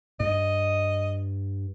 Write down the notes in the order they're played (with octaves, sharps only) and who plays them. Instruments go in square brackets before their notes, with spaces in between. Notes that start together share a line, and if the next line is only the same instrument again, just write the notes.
[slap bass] G2 [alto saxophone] D#5